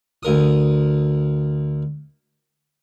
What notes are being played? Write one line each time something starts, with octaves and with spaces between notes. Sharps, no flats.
D2 A#4 D#6